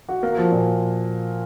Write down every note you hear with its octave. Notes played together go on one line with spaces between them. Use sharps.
F#4
A#3
F3
A#2